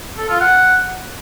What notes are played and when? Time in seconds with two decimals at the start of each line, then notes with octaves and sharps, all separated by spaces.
0.18 A4
0.29 F4
0.40 F#5